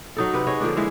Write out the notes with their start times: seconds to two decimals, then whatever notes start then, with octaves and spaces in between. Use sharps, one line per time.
0.17 F#3 D#4 A4
0.33 C3 B4 F#5 G5
0.46 G#4 C#5 D#5
0.61 D3 F3 A#3 D4
0.77 E3 G#3 E5 F5